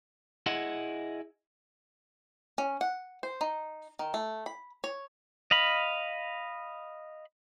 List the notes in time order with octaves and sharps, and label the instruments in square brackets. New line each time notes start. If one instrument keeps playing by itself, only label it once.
[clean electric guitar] E4 G#4 D#5 F#5
[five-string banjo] C#4
F#5
C5
D#4
D#3
A3
B5
C#5
[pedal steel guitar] D#5 F5 B5